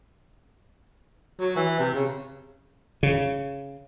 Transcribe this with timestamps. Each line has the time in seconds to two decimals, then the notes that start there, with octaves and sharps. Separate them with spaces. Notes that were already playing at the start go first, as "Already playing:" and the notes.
1.40 F#3
1.56 E3
1.79 C3
1.95 C#3
3.03 C#3